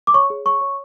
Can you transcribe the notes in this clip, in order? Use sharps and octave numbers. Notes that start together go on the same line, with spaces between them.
D6
C#5 C#6
G#4
C#5 C#6
C#5